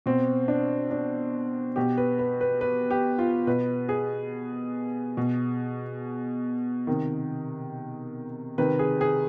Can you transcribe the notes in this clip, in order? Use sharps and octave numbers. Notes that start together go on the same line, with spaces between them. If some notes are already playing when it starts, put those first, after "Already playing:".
B2 C4
D4
D4
B2 G4
B4
B4
B4
B4
G4
F4
B2 B4
G#4
B2
C3 D#3
C3 D#3 B4
G#4
G#4